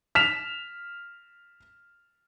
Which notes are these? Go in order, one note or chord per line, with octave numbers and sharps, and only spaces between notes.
F6 B6 E7 F7